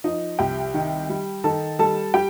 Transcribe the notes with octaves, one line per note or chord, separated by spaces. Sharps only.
F3 D#4 D#5
C2 G4 G5
D#3
G3
D#3 A4 A5
G3 A4 A5
G3 G4 G5